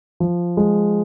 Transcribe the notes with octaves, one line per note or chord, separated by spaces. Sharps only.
F3
G#3